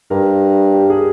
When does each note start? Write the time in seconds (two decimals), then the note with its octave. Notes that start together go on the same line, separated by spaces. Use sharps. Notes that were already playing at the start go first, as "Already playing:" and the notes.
0.10 G2 A#4
0.74 G4
0.90 G#4